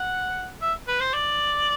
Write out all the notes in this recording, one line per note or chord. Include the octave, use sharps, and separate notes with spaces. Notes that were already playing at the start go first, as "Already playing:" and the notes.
Already playing: F#5
E5
B4
C5
D5